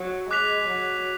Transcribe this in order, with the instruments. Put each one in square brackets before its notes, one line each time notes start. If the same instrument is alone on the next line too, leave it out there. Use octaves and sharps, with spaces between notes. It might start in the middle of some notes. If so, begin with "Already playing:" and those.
Already playing: [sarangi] F#3
[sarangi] G#3 [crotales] D6 F#6 B6 F7
[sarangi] F#3